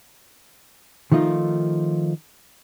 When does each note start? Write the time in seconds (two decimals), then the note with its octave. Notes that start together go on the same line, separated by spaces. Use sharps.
1.12 D#3 F3 A3 D#4 F4